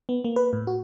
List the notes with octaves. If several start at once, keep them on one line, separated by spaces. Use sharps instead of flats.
B3
A#3
B4
A2
F#4